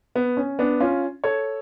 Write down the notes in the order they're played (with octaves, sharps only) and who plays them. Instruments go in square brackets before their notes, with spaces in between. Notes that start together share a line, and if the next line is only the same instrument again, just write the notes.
[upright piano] B3
C#4
B3 D4
C#4 F4
A4 C#5